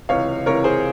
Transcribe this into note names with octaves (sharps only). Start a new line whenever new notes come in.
C#2 C3 E3 C#5 F5
C#2 C3 E3 A#4 C#5
G#4 C5